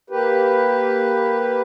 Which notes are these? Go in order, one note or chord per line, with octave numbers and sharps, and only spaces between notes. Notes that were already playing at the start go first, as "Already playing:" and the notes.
A#3 G4 B4